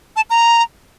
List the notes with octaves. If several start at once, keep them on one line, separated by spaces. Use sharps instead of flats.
A5
A#5